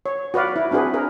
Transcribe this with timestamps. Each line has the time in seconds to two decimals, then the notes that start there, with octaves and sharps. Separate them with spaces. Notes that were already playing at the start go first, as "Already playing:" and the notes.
0.06 C#5
0.34 F#4 B4 D5 F5
0.56 E4
0.71 C4 D4 F#4 G#4 B4
0.94 G#4 A#4